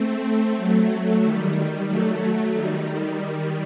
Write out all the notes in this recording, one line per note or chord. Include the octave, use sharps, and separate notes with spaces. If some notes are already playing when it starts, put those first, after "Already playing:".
Already playing: A3 C4
A3 C4
F#3 A3
D#3 G3
F#3 A3
D#3 G3
D#3 G3
D#3 G3